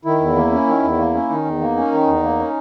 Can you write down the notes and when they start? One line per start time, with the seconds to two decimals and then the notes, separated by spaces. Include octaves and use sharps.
0.05 D#3 E4
0.21 E2
0.36 A#3
0.52 C#4
0.67 D#3
0.83 E2
0.98 A#3
1.14 C#4
1.29 D#3 D#4
1.45 E2
1.61 A#3
1.77 C#4
1.92 D#3
2.07 E2
2.23 A#3
2.39 C#4